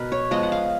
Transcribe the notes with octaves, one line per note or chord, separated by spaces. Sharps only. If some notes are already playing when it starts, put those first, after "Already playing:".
Already playing: B2 A#4 B4
C#5
F3 G#3 B3 D#5
F#5
F5